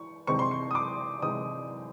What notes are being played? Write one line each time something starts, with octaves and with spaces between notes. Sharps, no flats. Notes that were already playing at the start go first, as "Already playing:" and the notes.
Already playing: E3 C#6
C3 E3 G#3 C4 D#4 C#6
C6
C#6
D#6
D6
C3 E3 G#3 C4 D#4 D#6